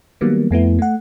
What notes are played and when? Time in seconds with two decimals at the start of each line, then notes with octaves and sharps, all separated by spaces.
0.21 D#3 F#3 G3 A#3 B3
0.51 F2 A3 B3 E4
0.79 A3 F#5